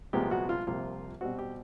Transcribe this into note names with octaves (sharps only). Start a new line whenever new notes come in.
C2 A#2 F3 G#3 B3 G4
F#4
F4
C2 C3 F3 A#3 F4
B2 G3 C4 F#4
G4